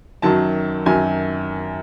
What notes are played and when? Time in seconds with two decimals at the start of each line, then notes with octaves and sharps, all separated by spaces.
0.22 F#2 D#3 F#3 A5
0.86 F#2 D#3 F#3 G#5